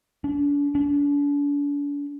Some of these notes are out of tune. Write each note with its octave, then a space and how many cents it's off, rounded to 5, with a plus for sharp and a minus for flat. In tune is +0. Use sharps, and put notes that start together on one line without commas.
D4 -40
D4 -40